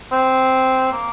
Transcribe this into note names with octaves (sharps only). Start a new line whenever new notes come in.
C4
A#3